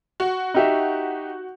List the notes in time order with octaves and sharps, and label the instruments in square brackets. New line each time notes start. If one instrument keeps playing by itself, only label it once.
[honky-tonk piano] F#4
[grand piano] D#4 G4 E5